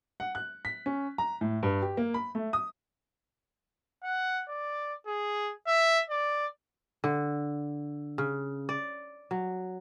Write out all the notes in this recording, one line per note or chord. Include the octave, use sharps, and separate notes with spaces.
F#5
F#6
B6
C#4
A#5
A2
G2
G4
A#3
B5
A3
D#6
F#5
D5
G#4
E5
D5
D3
C#3
D5
F#3